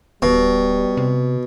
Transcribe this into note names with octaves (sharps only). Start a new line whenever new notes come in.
D1 B2 G3
C3